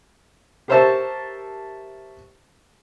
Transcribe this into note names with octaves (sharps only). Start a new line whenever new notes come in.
G4 A#4 C5 C#5 E5 A5